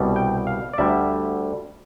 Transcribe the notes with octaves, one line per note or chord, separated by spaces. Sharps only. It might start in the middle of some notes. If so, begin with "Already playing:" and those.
Already playing: C2 B2 G3
G5
F5
D5
D2 D3 G3 E5